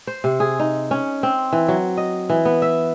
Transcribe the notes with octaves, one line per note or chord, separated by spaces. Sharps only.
C5
C3
G#4
D#4
C#4
C4
E3
F#3
D#5
E3
B3
E5